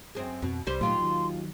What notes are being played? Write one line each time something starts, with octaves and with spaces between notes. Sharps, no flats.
F#2 C4 G#4
F2 B2 C4
C2 G3 B4 C5
D#2 A#2 F#3 A3 F4 G4 C6
D#3 F#3